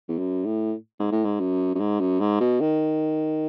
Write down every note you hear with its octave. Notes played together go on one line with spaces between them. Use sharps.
E2
F#2
A2
G#2
A2
G#2
F#2
F#2
G#2
F#2
G#2
B2
D#3